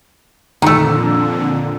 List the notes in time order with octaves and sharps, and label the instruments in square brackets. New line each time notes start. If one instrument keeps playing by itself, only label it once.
[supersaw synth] F2 A#2 D3 [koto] D#3 A3 [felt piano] A#5 E6